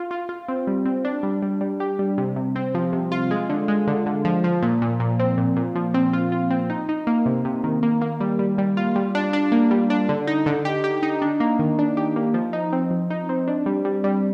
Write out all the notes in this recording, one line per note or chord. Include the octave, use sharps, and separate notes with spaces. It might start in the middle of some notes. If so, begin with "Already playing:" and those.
Already playing: F4
F4
F4
C4
G3
C4
D4
G3
G3
G3
G4
G3
C3
C3
C4
F3
C3
F4
G#3
D3
G#3
D3
D3
F3
F3
A#2
A#2
A#2
C4
A#2
A#2
F3
C4
F4
F4
C4
D#4
D#4
A#3
C3
C3
D#3
A#3
A#3
G3
G3
G3
F4
G3
D4
D4
A#3
G3
D4
D3
D#4
D3
G4
G4
D#4
D4
A#3
D#3
D4
G4
A#3
F3
D#4
C4
F3
D#4
C4
D4
G3
G3
G3